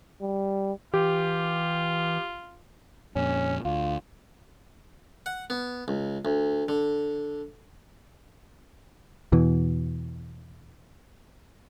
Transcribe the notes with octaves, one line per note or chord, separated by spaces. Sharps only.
G3
E3 F4 G4
F2 A#2 C#4
D2 F4
F#5
B3
C#2
D2
D3
E2 B2 E3